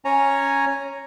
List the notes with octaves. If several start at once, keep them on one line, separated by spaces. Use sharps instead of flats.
C#4 C#5 G#5 A#5